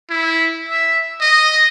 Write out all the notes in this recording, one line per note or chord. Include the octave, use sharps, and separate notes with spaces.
E4
E5
D#5